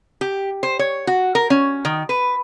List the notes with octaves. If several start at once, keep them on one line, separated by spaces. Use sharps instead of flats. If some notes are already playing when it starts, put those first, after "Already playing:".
G4
C5
C#5
F#4
A#4
C#4
D#3
B4